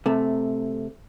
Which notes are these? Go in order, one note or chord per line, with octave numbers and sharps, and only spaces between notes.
C3 A3